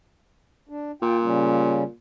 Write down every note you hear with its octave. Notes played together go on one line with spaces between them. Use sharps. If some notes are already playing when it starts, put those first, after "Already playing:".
D4
A#2 F4 G5
C#3 G3 C#4